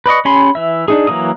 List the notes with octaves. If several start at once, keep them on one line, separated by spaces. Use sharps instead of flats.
B4 D5 D#5 C#6
C#4 G4 G#5 B5 C6
E3 E5
D4 D#4 G#4
E3 F#3 A#3 D#6